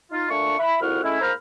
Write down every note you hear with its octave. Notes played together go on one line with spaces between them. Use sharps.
D#4 F4
A#2 A3 D4 C#6
E5 B5
C2 F2 E4 F#4 F#5 F6
G#3 A3 C#4 E4
G#2 A#3 C5 A#5 B5 F6